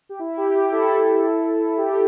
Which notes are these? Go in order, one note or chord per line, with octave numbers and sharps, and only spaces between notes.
G4
E4
G4
G4
E4 A4
G4